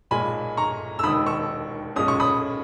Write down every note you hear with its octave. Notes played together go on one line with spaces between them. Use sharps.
B1 A#2 G#3 G#5 B5
A#5 C#6
E6
E1 D#2 D#3 B5 D#6
C#6 E6
B1 A#2 G#3 C#4 D#6
C#6
B5 D#6